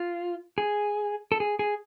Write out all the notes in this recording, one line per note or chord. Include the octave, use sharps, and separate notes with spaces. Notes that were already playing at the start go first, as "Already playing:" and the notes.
Already playing: F4
G#4
A4
G#4
G#4